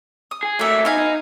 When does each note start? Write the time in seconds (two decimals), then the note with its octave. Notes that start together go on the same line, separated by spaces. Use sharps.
0.31 D#6
0.43 G#4
0.59 F#3 A3 A#3 E5
0.85 B3 D#4 F5 G#5
0.98 D#4